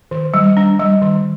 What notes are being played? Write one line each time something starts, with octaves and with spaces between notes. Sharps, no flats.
D#3
G3
D4
G3
D#3